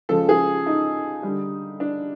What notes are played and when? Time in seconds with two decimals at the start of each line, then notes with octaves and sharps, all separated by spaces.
0.09 C#3 F3 G#3 A4
0.29 G#4
0.66 D#4
1.23 D3 G3
1.80 D4